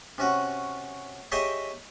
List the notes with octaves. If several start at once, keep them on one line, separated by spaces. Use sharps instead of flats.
C3 C#4 F#4
G4 G#4 C#5 D#5 E5 G5